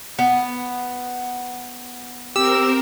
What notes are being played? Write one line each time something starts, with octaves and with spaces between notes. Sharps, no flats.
B3
C4 G4 A#4 E6